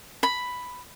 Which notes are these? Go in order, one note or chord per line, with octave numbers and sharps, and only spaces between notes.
B5